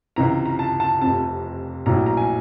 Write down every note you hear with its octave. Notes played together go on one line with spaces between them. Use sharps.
C#2 C3 E3 A#5
A#5
A5
A5
F1 F2 C3 A5
A#1 A2 F#3 A#5
A#5
G#5